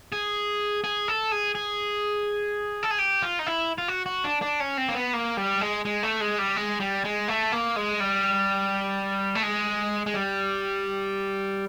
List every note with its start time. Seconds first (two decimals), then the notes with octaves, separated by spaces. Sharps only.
0.12 G#4
0.84 G#4
1.08 A4
1.32 G#4
1.55 G#4
2.83 A4
2.91 G#4
2.99 G4
3.22 F4
3.39 D#4
3.46 E4
3.78 F4
3.88 F#4
4.06 F#4
4.24 D4
4.42 D4
4.60 C#4
4.77 C4
4.88 A#3
4.96 B3
5.13 A#3
5.37 G3
5.61 G#3
5.85 G#3
6.03 A3
6.21 G#3
6.39 G3
6.56 G#3
6.80 G3
7.04 G#3
7.28 A3
7.52 A#3
7.76 G#3
8.00 G3
9.35 A3
9.43 G#3
10.06 G#3
10.14 G3